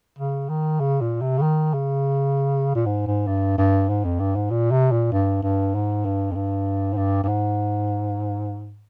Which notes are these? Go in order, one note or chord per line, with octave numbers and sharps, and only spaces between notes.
C#3
D#3
C#3
A#2
C3
C#3
D#3
C#3
A#2
G#2
G#2
G2
G2
G#2
F2
G2
G#2
A#2
C3
A#2
G2
G2
G#2
G2
F2
G2
G#2
G2
G2
G#2